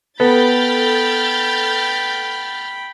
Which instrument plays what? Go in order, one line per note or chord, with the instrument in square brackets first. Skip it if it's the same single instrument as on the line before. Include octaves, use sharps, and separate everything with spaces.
[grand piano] B3 [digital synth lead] A4 [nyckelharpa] G5 B5 [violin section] F6 G6 A6